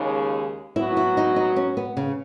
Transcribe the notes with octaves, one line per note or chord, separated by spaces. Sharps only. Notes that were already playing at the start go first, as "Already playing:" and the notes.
Already playing: D#2 C#3 G#3 D#4
F#3 B3 E4 F#4
E4
D#4
D#4
C#4
B3
C#3